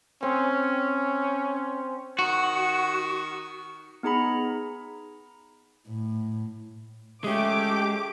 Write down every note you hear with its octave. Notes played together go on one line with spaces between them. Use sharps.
C4 C#4
D#3 F#4 C#6
B3 D#4 G#4 A#5 B5
A2
G#3 A3 C#4 G4 D6